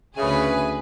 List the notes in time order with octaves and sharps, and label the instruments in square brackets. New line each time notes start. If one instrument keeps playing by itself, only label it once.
[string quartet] D2 C#4 G#5 [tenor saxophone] C#3 [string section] G#4 B4 [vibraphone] E5 D#6